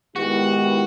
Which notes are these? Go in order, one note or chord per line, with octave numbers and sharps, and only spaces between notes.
D#3 G#3 B3 E4 F#4 G4